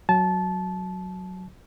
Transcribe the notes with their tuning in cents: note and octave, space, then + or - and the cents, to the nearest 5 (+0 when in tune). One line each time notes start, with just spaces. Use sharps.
F#3 +0 A5 -20